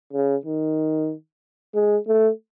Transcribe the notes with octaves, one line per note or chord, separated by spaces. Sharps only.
C#3
D#3
G#3
A3